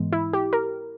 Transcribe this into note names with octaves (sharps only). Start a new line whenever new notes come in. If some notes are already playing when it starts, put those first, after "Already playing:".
Already playing: G#2 E3 G#3 B3
E4
G4
A#4